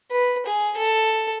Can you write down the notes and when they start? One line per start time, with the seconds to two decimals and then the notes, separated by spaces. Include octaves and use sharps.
0.11 B4
0.46 G#4
0.76 A4